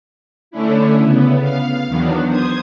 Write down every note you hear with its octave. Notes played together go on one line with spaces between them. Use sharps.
D3 A3 C#4 D4 E4
C#3 B3
F5
E2 D#3 F#3 B3 D4
C5 D#6 G#6